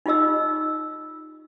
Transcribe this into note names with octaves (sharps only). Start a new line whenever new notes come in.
D#4 F4 G4 D#5 E6